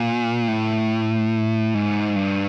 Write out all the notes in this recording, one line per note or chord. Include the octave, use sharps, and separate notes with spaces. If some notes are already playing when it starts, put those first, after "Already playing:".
Already playing: A#2
A2
G#2
G2